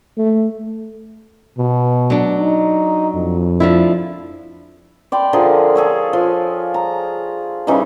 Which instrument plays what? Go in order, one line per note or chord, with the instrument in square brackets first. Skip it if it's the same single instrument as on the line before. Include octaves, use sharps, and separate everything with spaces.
[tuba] A3
[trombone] B2
[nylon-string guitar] F#3 D4
[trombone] D#4
F2
[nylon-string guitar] F3 D4 E4
[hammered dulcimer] D5 G5 B5 C6
D3 F3 G#4 A#4
G#4 A4 C#5
F3
A#5
C#3 E3 G3 D#4